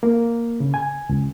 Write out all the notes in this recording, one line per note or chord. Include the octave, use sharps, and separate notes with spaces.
A#3
C#3
G#5
C#2